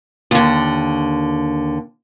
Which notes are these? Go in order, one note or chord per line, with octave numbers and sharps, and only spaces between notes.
D#2 D3